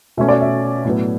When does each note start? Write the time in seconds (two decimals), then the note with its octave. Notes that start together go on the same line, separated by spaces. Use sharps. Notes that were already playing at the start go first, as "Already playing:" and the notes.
0.17 B2 A3 C#4 E5
0.29 D5
0.41 E5
0.85 A2 F#3 B3